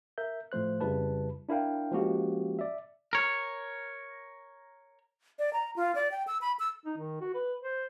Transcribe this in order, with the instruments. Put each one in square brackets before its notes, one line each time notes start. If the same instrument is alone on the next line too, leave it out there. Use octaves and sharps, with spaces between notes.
[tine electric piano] A#4 E5 G6
A2 F3 A3 C5 F#6
F2 C#3 G3 E4 B4 A5
D4 E4 A#4 F5 G5
F3 G#3 A#3 C#4 F#4 G4
D5 E5
[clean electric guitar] A#4 C#5
[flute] D5
A#5
F4
D5
G5
E6
B5
E6
[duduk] D#4
D#3
F#4
B4
C5